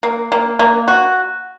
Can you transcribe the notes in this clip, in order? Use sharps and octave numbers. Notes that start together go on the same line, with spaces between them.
A#3
A#3
A#3
F#4